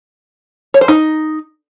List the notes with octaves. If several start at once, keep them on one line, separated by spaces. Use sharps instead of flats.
C#5
C5
D#4